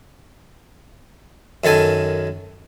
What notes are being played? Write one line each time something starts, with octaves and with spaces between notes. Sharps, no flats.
F#2 D#3 A4 G#5